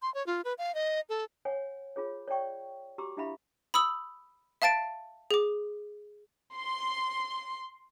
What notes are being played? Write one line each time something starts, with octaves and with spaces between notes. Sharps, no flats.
C6
C#5
F4
B4
F5
D#5
A4
C#5 F#5 G#5
F4 G#4 C#5
C#5 D5 E5 G5 C#6
F#4 G4 A#5 C6 D6 E6
D4 E4 G4 E5 F5 B5
B5 D#6 E6 F#7
E5 F5 A5 A6 D7
G#4 D6
C6